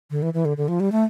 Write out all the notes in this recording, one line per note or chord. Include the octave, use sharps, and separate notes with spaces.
D3
E3
E3
D3
D3
F3
G3
A3